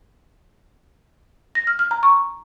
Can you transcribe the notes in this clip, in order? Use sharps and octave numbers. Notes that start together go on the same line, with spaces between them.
A#6
F6
F6
A#5
C#6